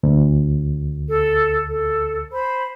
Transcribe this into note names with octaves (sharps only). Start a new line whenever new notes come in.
D2
A4
A4
C5 B5